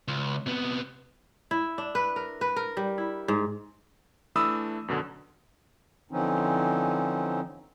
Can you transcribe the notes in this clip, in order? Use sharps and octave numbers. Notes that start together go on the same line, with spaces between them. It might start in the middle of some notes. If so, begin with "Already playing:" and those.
C#2
C3 B3
E4
D4
B4
A#4
B4
A#4
G3
E4
G#2
E3 A3 D4 B5 D#6 E6
F#2 B2 D3
D3 E3 F3 C4 C#4 D#4